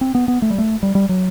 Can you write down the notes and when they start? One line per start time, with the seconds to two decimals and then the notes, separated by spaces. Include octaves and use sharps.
0.01 C4
0.15 B3
0.28 B3
0.42 A3
0.50 G3
0.58 A3
0.83 G3
0.95 G3
1.09 F#3